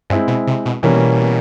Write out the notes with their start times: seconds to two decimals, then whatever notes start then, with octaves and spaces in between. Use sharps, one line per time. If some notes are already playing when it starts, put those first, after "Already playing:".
0.10 G2 G#3 C4 E4
0.27 B2
0.47 C3
0.65 B2
0.83 B2 E3 G3 A#3 C#4